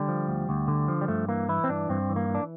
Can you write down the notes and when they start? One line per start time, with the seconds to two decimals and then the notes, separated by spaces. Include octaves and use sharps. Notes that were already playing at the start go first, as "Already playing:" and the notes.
Already playing: D3 G3
0.08 F3
0.28 D2
0.49 D2
0.68 D3
0.88 F3
1.01 G3
1.08 G2 A3
1.29 E3 A#3
1.49 E3 E4
1.64 C4
1.69 G2 D4
1.89 G2 C4
2.09 E3
2.16 A#3
2.29 E3
2.35 D4